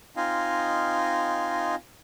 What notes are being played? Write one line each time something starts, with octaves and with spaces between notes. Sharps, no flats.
C4 D#4 F4 D#5 F5 G#5